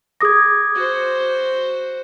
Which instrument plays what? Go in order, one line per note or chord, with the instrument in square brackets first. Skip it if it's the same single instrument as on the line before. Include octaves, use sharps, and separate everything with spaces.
[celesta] G#4 D#6 A#6 [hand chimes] D6 G#6
[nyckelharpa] F#4 C5